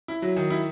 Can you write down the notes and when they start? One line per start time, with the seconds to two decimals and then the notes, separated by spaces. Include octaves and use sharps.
0.08 E4
0.22 F#3
0.36 D#3
0.50 E4